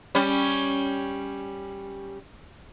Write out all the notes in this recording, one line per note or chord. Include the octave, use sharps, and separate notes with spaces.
G3 C#4